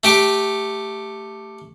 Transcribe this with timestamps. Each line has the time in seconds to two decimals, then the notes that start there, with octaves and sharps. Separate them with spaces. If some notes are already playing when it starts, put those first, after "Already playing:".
0.04 A3 G4 D6